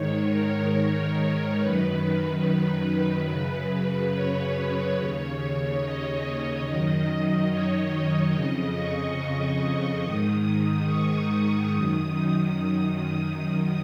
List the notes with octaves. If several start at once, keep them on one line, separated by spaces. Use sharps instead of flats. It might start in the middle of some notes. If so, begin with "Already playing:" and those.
Already playing: G#2 D#3 C#5
A#4
F#2 D#3 B4
F#2 C#3
C#5
D#2 C#3
D#5
F#2 D#3
C#5
F2 C#3 D#5
C#6
G#2 D#3 D#6
C#6
C#6
F#2 D#3 D#6
D#6